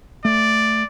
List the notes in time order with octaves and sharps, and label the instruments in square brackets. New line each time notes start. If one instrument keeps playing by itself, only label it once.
[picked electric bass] A3 [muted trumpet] D5